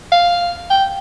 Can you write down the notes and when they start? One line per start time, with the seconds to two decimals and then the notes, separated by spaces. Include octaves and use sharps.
0.12 F5
0.70 G5